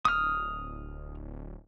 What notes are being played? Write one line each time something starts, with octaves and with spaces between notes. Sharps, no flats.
D1 D#6 F6